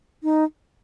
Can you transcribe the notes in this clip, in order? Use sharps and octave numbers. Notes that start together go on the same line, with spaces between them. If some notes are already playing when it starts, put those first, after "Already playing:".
D#4